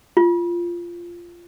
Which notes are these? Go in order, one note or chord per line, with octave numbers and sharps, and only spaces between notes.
F4